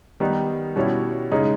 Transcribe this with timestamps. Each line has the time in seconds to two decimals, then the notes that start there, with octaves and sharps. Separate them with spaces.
0.20 D#3 G3 B3 D#4
0.76 B2 G3 C#4 E4
1.32 C#3 G#3 D#4